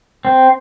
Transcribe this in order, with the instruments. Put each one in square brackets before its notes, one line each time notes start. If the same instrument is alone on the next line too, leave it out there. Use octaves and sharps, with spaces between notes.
[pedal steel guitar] C4